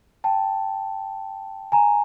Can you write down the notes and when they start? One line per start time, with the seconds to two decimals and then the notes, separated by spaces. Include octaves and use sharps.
0.24 G5 A5
1.72 G#5 A#5